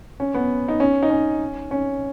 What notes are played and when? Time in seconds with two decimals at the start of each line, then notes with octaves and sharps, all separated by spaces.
0.20 C#4
0.34 B3
0.68 D#4
0.80 C#4
1.02 D#4
1.10 C#4
1.71 C#4